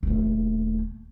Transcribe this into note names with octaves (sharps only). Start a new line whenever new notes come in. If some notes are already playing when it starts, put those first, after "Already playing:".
D#1 A3